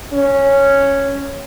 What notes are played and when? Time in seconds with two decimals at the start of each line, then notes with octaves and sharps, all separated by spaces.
0.14 C#4